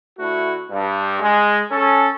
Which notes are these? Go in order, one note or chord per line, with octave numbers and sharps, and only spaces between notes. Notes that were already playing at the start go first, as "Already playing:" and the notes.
D2 A3 E4 F#4
G2
G#3
C#4 A4